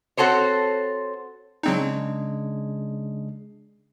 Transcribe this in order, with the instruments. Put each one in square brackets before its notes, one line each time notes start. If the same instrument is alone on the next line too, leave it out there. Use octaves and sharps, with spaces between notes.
[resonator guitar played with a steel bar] C4 F#4 A4 C5 C#5
[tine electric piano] C#3 G#3 D4 [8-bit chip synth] F#3 C4 D#4